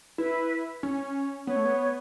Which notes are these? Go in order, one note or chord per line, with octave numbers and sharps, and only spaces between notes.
E4 B4
C#4
B3 C#5
A3
B3